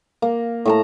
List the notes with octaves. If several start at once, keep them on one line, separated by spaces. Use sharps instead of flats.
A#3
A2 A5 A#5